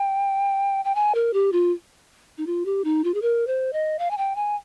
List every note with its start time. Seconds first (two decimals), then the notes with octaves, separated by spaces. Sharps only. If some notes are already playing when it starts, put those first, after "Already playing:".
Already playing: G5
0.85 G5
0.95 G#5
1.15 A#4
1.33 G4
1.52 F4
2.38 D#4
2.47 F4
2.65 G4
2.84 D#4
3.04 F4
3.14 G#4
3.22 A#4
3.47 C5
3.73 D#5
3.99 F5
4.11 G#5
4.18 G5
4.36 G#5